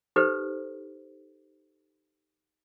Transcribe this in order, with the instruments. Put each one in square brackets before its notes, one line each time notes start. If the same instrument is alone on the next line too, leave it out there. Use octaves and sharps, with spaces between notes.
[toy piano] D#4 G4 A4 B4 C5